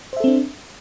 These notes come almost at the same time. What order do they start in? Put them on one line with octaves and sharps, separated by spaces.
C5 E5 A4 C4 D4